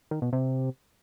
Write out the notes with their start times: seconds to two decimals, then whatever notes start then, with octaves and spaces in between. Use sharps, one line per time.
0.11 D#3
0.22 B2
0.33 C3